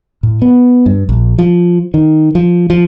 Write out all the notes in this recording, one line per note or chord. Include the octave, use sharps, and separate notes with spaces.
A2
B3
G2
A#1
F3
D#3
F3
F3